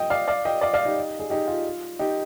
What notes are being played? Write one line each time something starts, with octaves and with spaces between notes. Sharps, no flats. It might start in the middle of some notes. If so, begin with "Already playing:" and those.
Already playing: D#5 G5
D5 F5
D5 F5
D#5 G5
D5 F5
D5 F5
D#4 G4
G#4
D#4 G4
F4
D#4 G4